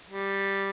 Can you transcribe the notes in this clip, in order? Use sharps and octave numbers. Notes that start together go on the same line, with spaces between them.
G3